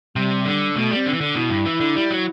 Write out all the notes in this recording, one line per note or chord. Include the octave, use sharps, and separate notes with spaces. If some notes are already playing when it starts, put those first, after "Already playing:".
C3 G3
D3
B2 A3
G3
C4
D3
E3
D3
B2 E4
G2
E3
D3
G3
F#3